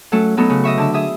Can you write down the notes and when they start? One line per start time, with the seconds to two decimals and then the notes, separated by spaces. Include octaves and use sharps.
0.12 F#3 A3 C#4 A4
0.37 F#3 B3 D#4 A4
0.50 C#3
0.64 D#5 E5 C#6
0.77 D3 A5 E6
0.94 G#4 E5 D#6